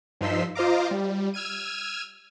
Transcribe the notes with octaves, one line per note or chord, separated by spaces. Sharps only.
G2 F3 D#4 C6 E6 B6
F4 C5 D#5 F5 A#5 D6
G3
E6 F6 G#6 D#7